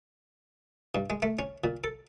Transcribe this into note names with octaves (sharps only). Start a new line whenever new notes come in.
G2
G#3
A3
C#4
A#2
A4